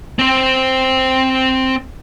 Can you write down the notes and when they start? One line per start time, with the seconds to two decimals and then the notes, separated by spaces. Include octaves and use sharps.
0.19 C4 C5